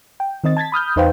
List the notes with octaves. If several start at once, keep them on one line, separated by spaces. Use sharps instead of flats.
G5
D#3 C4 D#5 A6
A5 G#6 A6 B6
B5 D#6 F6 G6
E2 D#4 B4 C5 F5 G5